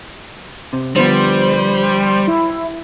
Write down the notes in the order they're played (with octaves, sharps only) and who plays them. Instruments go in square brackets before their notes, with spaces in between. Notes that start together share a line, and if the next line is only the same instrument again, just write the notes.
[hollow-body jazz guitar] C3
[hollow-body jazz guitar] D3 F3 B3 [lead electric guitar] G3 [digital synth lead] C5
[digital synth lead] E4